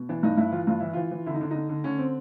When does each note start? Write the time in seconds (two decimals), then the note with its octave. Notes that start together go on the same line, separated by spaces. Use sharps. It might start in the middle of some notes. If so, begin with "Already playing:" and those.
Already playing: B2
0.09 E3 D4
0.23 G2 D#4
0.37 G2 E4
0.52 E3 F4
0.67 G2 F4
0.80 E3 E4
0.93 E3 F4
1.11 E3
1.26 D3 E4
1.34 D#4
1.41 D3 D4
1.51 D3 D#4
1.69 D3
1.84 D3 C#4
1.98 C4